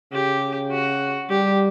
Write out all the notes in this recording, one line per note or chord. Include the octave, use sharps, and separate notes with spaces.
C#3 G4
F#4
G3 G4